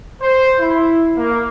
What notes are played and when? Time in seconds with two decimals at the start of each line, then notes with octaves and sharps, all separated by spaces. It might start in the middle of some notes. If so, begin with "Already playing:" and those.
0.21 C5
0.60 E4
1.17 A#3